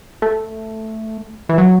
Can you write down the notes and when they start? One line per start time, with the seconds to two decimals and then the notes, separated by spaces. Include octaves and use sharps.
0.22 A3
1.49 E3
1.58 F#3